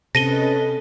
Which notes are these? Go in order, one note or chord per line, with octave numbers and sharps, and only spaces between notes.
C3 C#4 A4 B4 D#5 A#6 D#7 G7